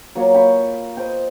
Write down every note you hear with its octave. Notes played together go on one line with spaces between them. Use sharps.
F#3 A#3 F4 C#5
G5 B5 C#6
C5 D#5 G5